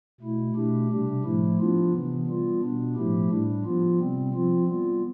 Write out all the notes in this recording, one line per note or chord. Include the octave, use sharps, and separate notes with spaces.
B2 A3 E4
B2 A3 D4 G4
C3 G3 D4 G4
A2 F3 A3 E4
F3 B3 D4 F4
C3 E3 B3
G3 B3 F4
B2 B3 D4
A2 F3 A3 E4 G4
A2 G3 D4
F3 B3 F4
C3 G3 C4
F3 C4 F4
G3 B3 F4